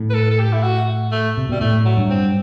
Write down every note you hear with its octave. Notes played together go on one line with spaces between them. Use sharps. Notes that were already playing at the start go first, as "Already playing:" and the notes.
Already playing: A2
B4
A4
A4
G4
E4
F#4
A3
C3
B2 G3
A2 A3
F#3
G2
C4